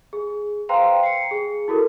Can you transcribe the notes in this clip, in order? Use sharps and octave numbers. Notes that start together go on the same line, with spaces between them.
G#4
B4 C5 F5 G5 A#5 C6
C7 C#7
G#4
E4 F#4 A4 A#4